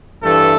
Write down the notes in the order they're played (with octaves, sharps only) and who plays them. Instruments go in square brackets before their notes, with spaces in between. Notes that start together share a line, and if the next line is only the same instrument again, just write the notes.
[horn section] G2 E3 A3 A4